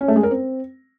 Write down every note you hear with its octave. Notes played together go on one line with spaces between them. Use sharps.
C#4
A3
G#3
A#4
C4